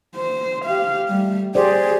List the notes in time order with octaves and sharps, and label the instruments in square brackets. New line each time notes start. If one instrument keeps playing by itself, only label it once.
[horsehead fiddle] C5
G4 F5
G3 A3
[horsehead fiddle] G4 [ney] G#4 [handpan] C5 D5